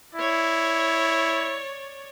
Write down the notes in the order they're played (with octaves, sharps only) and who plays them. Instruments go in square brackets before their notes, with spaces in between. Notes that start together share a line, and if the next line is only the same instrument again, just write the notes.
[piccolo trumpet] E4 [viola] C#5 D5